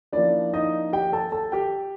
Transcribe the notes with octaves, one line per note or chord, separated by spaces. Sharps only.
F3 A#3 C#4 D4 E4 D5
D#4 D#5
G4 G5
A4 A5
A4 A5
G4 G5